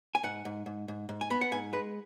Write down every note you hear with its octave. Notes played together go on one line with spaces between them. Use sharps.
G#5
G#2 F#5
G#2
G#2
G#2
G#2
G#5
B3 B5
F#5
G#2 G#5
G#3 B4